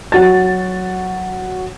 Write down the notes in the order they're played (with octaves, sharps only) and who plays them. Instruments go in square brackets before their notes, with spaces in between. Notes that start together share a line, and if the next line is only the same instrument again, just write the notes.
[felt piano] F#3 F#4 A6